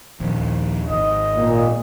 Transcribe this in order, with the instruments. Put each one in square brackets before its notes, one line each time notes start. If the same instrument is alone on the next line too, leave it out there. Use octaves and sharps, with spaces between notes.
[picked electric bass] A#1 D#2
[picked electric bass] G#1 [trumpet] D#5
[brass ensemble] A#2